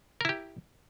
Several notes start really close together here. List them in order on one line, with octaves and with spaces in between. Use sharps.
A#4 E4 G4